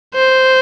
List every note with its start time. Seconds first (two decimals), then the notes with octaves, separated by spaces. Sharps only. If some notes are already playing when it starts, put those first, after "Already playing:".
0.15 C5